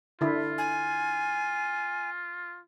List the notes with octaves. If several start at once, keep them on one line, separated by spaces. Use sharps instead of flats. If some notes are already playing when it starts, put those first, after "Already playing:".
D3 E4 F4
G#5